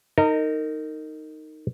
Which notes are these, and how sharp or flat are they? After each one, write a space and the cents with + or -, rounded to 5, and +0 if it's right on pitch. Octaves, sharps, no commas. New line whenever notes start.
D#4 +0 A#4 -30 D#5 +0